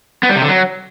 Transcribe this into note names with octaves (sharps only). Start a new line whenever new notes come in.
B3
G3
C3
D3
F#3